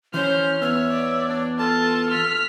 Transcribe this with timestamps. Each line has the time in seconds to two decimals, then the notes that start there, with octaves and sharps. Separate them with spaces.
0.14 E3 C#4 C5 C#5 F6
0.62 E2 B3 C#5 E5
0.92 D5
1.28 D4
1.59 F4 A4 A5
2.11 F6 B6